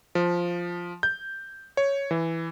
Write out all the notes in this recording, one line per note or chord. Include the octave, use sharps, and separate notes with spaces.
F3
G6
C#5
E3